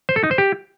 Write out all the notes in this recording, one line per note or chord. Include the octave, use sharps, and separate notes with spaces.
C5
A4
D#4
C5
G4